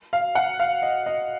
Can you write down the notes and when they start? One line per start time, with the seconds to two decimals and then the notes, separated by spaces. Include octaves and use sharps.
0.13 F5
0.35 F#5
0.60 F5
0.82 D#5
1.06 D#5